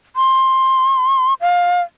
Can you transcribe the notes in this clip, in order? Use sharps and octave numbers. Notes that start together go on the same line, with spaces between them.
C6
F5